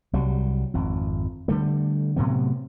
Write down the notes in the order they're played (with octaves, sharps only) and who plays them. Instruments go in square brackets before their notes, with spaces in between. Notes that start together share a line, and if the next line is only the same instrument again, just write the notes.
[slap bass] C2 F#3 G3
G#1 F2
D3 G3 A3
A2 C3 F#3 B3